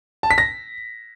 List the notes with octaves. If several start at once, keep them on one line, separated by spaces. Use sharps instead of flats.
A5
B6
A#6